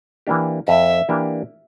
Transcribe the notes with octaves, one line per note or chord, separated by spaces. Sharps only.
E3 A#3 D4 G4
F2 E5
E3 A#3 D4 G4